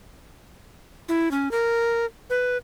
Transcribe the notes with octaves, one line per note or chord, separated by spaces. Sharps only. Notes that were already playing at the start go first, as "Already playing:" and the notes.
E4
C#4
A#4
B4